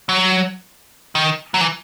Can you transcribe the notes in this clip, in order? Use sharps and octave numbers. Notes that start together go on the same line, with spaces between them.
F#3
D#3
F#3
E3